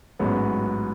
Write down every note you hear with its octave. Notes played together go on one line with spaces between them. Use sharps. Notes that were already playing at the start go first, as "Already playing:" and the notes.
A1 G#2 F#3 B3